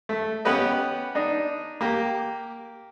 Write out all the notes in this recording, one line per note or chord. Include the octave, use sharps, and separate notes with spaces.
A3
B3 C#4 G4 B4 D#5
D4 D#4
A#3 G4